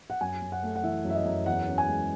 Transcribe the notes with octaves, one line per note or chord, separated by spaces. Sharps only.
F#5
F#2 G#5
F#2
F#5
A3
F#5
E3 E5
F#2
E5
D#5
F#2
E2 F#5
C#4
G#5
G#3